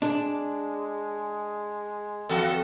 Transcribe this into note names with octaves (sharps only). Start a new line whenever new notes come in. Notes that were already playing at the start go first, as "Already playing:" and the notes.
G#3 D4
F2 B3 F#4 A4